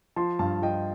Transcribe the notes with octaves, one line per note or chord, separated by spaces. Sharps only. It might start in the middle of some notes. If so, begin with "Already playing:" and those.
F3 A5 C6
G2 F5 A5
F3 D#5 G5